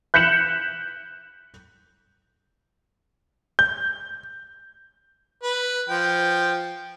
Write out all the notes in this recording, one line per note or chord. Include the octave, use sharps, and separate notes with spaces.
F#6 G6 B6 C#7 E7 F#7
G6
B4
F3 G5